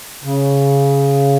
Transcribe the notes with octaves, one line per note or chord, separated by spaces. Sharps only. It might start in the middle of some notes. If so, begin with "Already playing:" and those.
C#3